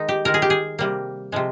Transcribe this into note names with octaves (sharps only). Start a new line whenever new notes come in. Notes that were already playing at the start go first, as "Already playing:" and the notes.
Already playing: D#3 G#3 D#4
G4
D#3 G#3 A#4
G#4
G4
G#4
C3 G3 A#3
C3 F3 G#3